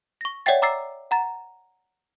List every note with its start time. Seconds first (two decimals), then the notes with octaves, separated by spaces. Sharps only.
0.21 C#6 A#6
0.46 C#5 D5 E5 F#5 G5 A6
0.62 A#5 D6 E6 A6 C7
1.11 F#5 A#5 A6